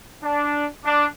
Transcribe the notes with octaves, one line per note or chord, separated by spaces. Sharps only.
D4
D4